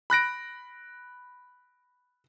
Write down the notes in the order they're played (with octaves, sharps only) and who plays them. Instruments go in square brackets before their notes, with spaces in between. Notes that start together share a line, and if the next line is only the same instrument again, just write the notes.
[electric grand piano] B5 F#6 A#6 D7